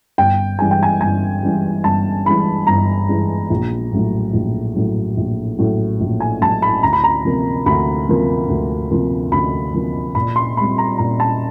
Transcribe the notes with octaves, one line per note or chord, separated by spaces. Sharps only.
G1 G5
G2 E3 G#3 G#5
G5
G#5
G1 G#5
G2 E3 G#3
G1 A5
G2 E3 G#3 B5
G1 A#5
G2 E3 G#3
A#1
A2 F#3
A#1
A2 F#3
A#1
A2 F#3
A#1
G#5
A2 F#3 A5
B5
D2 A#5
B5
A#5
C3 F3 A#3
D2 B5
C3 F3 A#3
D2
C3 F3 A#3
D2 B5
C3 F3 A#3
A#2 B5
C6
G3 C4 B5
A#5
A#2 A#5
A5